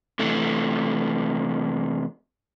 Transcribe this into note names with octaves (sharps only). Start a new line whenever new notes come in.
C3 E3 A3